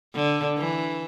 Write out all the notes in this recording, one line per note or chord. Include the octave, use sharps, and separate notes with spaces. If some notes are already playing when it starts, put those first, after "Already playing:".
D3
E3